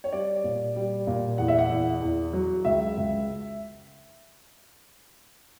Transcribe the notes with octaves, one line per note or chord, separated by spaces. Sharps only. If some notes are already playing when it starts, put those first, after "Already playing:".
C#5
G3 D5
A#2
G3
A#2
E2 F#5
E5
F#5
E2
E2
F#3
C#2 E5
C#2